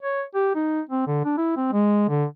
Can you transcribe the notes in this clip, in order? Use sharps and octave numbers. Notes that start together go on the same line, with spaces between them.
C#5
G4
D#4
C4
D3
D4
E4
C4
G#3
D3